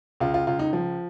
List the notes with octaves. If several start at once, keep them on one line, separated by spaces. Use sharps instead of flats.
C#2 F4
F4
C#2 F4
D#4
F3